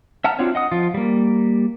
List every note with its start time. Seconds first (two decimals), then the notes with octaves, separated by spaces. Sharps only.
0.24 E5 F#5 A5 A#5 F6
0.39 C4 D4 F4 F#4 C#5
0.55 D#5 F#5 D#6
0.71 F3 F4
0.94 G3 A#3